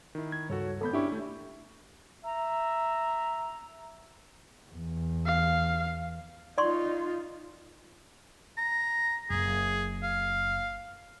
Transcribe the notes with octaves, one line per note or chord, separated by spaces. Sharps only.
D#3 E4
G#6
C#2 G2 F#4 A4 C#5
G#1 B3 A4 B5 G6
C#4 D4 E4 G4 E5 C#6
A3 E4
E5 A#5
E2
F5
D#4 F4 D5 C6 C#6
A#5
F#1 A#3 G#4
F5